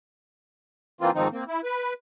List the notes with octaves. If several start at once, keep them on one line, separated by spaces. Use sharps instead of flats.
E3 A#3 C4 F4
G#2 D#3 F3 C4 D#4
A#3 C4
E4
B4